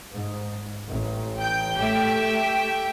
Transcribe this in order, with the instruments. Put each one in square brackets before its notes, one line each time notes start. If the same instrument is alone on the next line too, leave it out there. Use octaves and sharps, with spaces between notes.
[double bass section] G#2
A1
[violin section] G5 G6
[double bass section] A3 [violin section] G4 E5 G5